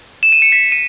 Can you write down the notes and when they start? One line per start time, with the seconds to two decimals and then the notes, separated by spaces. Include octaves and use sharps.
0.23 E7
0.32 D#7
0.42 C#7
0.52 B6
0.72 D#7